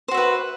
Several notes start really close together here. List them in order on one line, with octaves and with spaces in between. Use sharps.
C5 F#4 E5 B4